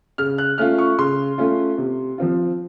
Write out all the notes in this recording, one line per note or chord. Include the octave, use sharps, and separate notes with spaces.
C#3 F6
F#6
A3 C#4 F4 F6
C#6
C#3 C6
A3 C#4 F4
C3
F3 C4 F4